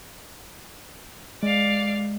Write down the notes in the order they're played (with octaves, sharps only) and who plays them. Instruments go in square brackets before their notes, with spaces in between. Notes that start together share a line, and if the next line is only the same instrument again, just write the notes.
[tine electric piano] G#3 [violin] D5 F5